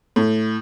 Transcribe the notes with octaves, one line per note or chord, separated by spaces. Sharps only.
A2